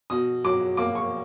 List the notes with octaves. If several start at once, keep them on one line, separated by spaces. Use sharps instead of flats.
B2 D#6
F#3 D6
A#3 D6
C#6